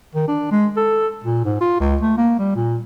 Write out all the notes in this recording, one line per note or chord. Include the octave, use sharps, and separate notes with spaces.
D#3
D4
G#3
A4
A#2
G#2
F4
C#2
A3
A#3
G3
A#2